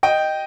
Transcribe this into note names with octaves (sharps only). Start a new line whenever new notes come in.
D#5 G5